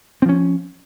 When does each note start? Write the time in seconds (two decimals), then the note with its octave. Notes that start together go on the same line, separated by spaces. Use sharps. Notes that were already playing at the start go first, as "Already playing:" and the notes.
0.22 C4
0.26 F3
0.29 C#4